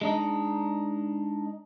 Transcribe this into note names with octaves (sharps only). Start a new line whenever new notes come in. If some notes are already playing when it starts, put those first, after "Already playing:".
G#3 D4 D#4